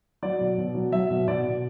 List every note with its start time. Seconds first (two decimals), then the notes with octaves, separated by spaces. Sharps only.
0.22 F#3 D5
0.41 B2
0.58 B2
0.75 F#3
0.92 F#3 E5
1.10 B2
1.28 B2 D5
1.44 B2